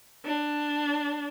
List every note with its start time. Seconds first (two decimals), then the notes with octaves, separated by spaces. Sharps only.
0.25 D4